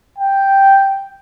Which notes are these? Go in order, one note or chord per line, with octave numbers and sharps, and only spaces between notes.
G5